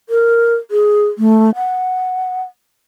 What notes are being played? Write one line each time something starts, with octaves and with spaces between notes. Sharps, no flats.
A#4
G#4
A3
F#5